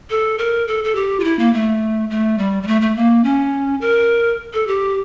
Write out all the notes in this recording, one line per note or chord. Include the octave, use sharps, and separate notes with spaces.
A4
A#4
A4
A4
G4
F4
E4
A#3
A3
A3
G3
G3
A3
A3
A#3
C#4
A#4
A4
G4